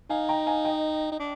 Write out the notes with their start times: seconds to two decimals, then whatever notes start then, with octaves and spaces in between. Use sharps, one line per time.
0.10 D#4 F5 G#5
0.29 G5 A#5
0.46 F5 G#5
0.65 D#5 G5
1.11 D#4
1.19 D4